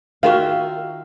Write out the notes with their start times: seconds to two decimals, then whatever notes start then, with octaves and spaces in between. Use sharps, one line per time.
0.23 D#3 F4 F#4 A#4 E5 F5